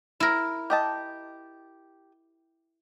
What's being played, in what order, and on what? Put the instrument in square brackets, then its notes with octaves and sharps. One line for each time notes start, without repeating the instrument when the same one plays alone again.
[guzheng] E4 A#4
[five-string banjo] G4 D#5 A5